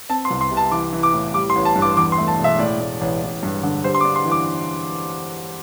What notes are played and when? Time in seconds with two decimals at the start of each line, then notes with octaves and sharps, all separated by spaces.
0.09 C4 A5
0.25 C6
0.30 C2
0.41 C6
0.51 C3
0.57 A5
0.71 E3 D6
0.93 E3
1.03 D6
1.14 A2
1.34 G3 D6
1.50 C6
1.55 A1
1.65 A5
1.76 G2
1.82 D6
1.97 E2 D6
2.12 C6
2.18 A3
2.28 A5
2.38 E1
2.44 E5
2.59 A2 D5
2.80 A2
3.01 A1
3.22 A1
3.43 G2
3.63 D3
3.84 G3 C5
3.95 C6
4.00 D6
4.05 D4
4.16 C6
4.25 E3
4.31 D6